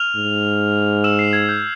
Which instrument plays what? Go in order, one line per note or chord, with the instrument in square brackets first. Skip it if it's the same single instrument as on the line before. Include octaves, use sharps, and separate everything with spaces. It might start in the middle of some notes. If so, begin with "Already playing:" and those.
Already playing: [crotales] F6 F7
[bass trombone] G#2
[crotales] E6 E7
C7
G#6
G6